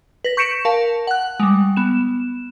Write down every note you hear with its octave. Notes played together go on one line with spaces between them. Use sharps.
B4 A#6
C#6 G6 B6 C#7 D7 E7
A#4 F5 A5
F#5 F#6
G3 G#3
B3 E7